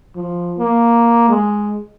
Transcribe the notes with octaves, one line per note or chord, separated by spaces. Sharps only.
F3
A#3
G#3